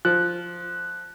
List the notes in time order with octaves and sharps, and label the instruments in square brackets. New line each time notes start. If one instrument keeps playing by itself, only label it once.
[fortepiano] F3 [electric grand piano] F#6